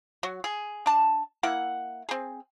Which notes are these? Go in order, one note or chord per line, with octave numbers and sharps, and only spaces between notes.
F#3 F#4
G#4
D4 A5
A#3 E4 F#5
C4 G#4